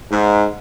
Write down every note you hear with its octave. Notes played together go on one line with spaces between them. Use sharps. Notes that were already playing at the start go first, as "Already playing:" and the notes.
G#2